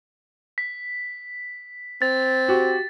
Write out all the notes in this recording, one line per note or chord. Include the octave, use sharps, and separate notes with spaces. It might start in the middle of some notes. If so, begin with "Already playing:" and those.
B6
C4 A6
F#4 G4